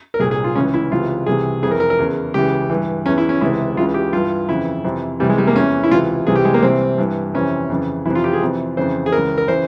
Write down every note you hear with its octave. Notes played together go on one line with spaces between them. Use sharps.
A#4
C2 A#2 G#4
G#4
F4
C#2 C#3 E3 C#4
E4
C#2 C3 E3 F4
C2 C3 E3 G#4
F2 E3 G#4 A#4
A#4
A#4
E2 C#3 E3
C#2 C#3 E3 G4
G2 E3
E2 E3 C#4
E4
C#4
C#2 C3 E3 E4
C#2 C#3 E3 F4
G4
G2 E3 F4
F2 C#3 E3 E4
F2 C3 E3
C2 C3 E3 G3
G#3
G3
A#3
E2 E3 C#4
E4
C#2 C3 E3 F4
C2 C3 E3 G#4
G4
G#3
A#3
C2 C3 E3 C4
G2 E3
F2 C3 E3 C#4
F2 C#3 E3
F2 C3 E3 E4
F4
G4
G#4
F2 C3 E3
F2 C#3 E3 C5
G#4
C#2 C#3 E3 A#4
A#4
C#3 E3 C5